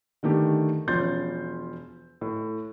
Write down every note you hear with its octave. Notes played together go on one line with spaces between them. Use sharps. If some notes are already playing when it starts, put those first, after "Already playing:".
D3 D#3 A3 G4
E1 F3 C#4 C6 G6 A6
A2